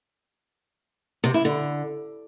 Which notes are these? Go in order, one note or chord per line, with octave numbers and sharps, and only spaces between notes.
C3
E4
D3